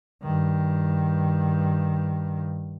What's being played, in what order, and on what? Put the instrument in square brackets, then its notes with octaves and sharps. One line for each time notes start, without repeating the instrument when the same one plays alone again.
[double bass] G2 D#3